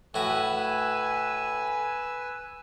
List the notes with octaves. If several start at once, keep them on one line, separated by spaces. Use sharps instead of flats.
A2 F#4 B4 G#5 E6